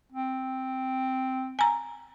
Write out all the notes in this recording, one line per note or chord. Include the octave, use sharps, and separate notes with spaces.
C4
G#5 A#5